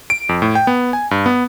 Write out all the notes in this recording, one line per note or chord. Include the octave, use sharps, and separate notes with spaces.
D7
F2
A2
G5
B3
G#5
G2
B3